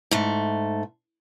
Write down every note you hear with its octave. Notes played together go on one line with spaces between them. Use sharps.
G#2 A3